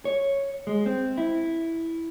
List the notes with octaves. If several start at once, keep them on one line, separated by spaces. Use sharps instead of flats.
C#5
G#3
C4
E4